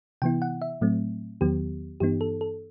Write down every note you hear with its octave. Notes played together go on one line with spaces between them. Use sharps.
C3 E3 B3 E4 G5
F#5
E5
A2 F#3 A3 C4
E2 D#3 F#3 B3 G4
G2 E3 B3 D#4 G4
A4
A4